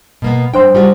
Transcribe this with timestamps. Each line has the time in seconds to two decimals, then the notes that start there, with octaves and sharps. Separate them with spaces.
0.22 B2 A#3 B3
0.54 G2 F#3 D4 C5 G5 C6
0.75 G3 F4 F#4